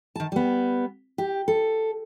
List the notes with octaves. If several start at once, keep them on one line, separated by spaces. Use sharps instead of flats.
D#3 A5
G3 B3
G4
A4